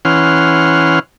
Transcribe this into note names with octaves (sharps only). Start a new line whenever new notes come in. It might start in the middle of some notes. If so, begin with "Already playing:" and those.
E3 C#4 F#5 C6 F6